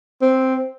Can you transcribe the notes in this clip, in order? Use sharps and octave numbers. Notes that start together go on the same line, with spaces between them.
C4